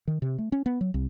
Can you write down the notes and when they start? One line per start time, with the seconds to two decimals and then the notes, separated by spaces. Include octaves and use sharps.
0.07 D#3
0.22 C3
0.38 A3
0.52 C#4
0.66 B3
0.81 F#3
0.94 C2